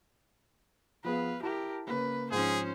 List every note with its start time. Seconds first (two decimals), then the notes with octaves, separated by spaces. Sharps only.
1.04 F3 B3 G#4 B4 F5
1.43 E4 G4 A#4 A5
1.88 C#3 A#3 B4
2.32 G#2 F3 C#4 G#4 C5